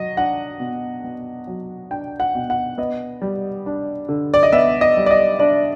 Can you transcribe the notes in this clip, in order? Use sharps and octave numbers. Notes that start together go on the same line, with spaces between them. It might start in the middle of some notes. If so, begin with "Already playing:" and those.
Already playing: F#3 D#5
D4 F#5
B2
B3
F#3
D4 G5
F#5
B2
F#5
B3 D#5
G3
D4
D3
D5
D#5
B3 E5
D#5
G3
D5
D#5
D4 D5